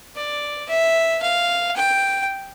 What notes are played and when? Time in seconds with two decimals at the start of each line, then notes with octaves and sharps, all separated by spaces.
0.16 D5
0.69 E5
1.22 F5
1.76 G5